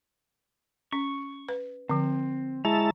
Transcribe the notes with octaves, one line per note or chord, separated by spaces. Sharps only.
C#4 C#6
B4
D3 F3 C4
G#3 E4 C#5 A5 A#5